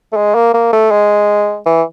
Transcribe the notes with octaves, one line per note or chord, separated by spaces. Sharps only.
A3
G#3
A#3
A#3
A3
G#3
E3